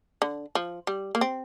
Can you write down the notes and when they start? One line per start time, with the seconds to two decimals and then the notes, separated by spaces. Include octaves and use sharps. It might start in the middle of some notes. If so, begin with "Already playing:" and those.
0.22 D3
0.55 F3
0.87 G3
1.15 A#3
1.21 C4